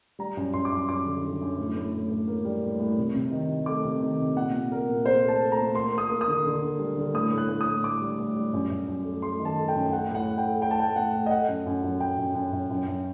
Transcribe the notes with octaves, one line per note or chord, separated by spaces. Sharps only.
G3 A#5
F#2
F#2 C6
D6
F#2 C6
F#2 D6
D3
D3
F#2
A2
A2
A2
A2
A#3
G3
A2
A2
C3
C3
D#3
C3
A3 D6
C3
D#3
C3
A#2 F#5
A#2
A#2 A#4
A#2
A#2 C5
A3
A5
A3
A#5
A#2
A#3 C6
A#3
D#6
A#3
D#6
D3
D3
D3
G3
D3
A2 D#6
A2
F#6
A2
D#6
A2
A2 D6
G3
A2
G3
F#2
F#2
F#2
A3
A3 C6
D#3
A5
A3
G5
F#2
A3 F#5
A2
F#5
A3
G5
A3
A3 G5
A5
A3 G5
A2 F#5
A2
D#5
A3 F#5
F#2
F#2
F#2
F#2 G5
F#2
F#2
F#2
F#2
F#2